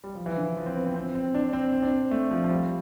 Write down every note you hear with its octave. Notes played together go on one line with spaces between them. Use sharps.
G3
F3
E3
D3
F3
C4
B3
C4
C4
C4
D4
C4
C4
D4
C4
A3
F3
F3
G3